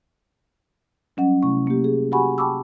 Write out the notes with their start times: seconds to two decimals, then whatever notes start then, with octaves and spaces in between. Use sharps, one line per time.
1.17 F#3 G3 C#4 D#5 F#5
1.43 C3 A3 E4 C#6
1.67 A#3 G4
1.84 G#4
2.12 F#4 G4 F#5 G#5 B5 C#6
2.38 G5 A5 B5 C#6 D6 E6